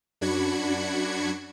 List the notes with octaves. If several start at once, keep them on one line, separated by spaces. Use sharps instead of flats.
F#2 D4 F#4 B5 G#6 C#7